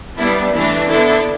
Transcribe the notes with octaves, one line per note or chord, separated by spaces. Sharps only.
G3 B3 D4 E4
E3 A3 D4 E4
D3 B3 D4 E4 A4